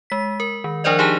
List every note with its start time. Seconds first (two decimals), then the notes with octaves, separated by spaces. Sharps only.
0.10 G#3 B6
0.40 A#4
0.64 D#3
0.84 F3 D4 A#4 C5 D5 D#5
0.99 D4 D#4 G4 G#4 G#5 A5